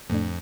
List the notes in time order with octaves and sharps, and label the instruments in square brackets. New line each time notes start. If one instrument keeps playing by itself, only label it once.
[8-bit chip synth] F2 [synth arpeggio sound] A2 A3 D4